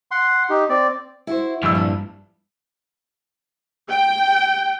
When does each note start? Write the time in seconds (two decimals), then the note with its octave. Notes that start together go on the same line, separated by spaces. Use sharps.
0.11 F#5 C6
0.50 D#4 G4
0.69 C4 D5
1.27 E4 F#4 C5
1.63 A#1 G2 D#4 E6
1.75 D4
3.90 G5